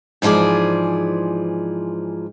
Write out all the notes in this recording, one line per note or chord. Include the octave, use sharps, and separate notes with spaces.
G#2 E3 F3 G#4 D5